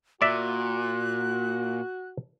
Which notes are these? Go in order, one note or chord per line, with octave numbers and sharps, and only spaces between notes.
A#2 F#4 D5 E5 F#6